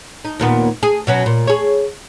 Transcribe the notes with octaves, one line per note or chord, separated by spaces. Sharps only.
D#4
D#2 A#2 B3
G#4
B2 F#3 C#4
A#2
G#4 C#5